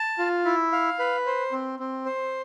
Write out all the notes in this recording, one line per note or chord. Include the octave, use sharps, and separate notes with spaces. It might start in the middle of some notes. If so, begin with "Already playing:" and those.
Already playing: A5
F4
E4
F5
B4
C5
C4
C4
C5